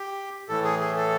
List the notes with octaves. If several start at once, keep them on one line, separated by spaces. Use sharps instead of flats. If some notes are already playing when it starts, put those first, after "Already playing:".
Already playing: G4
A2 E3 A3 A4
G#4
G#4
A4